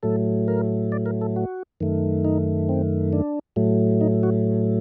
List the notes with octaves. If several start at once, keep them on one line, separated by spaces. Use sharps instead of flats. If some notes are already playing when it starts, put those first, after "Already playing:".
A2 F#3 A3 A4
A#4
D5
A#4
A4
F#4
F#2 D#3 A3
D#4
C4
D4
A2 F#3 A3
D#4
F#4